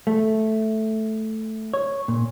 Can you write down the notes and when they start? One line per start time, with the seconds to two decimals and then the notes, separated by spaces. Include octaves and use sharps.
0.07 A3
1.74 C#5
2.08 A#2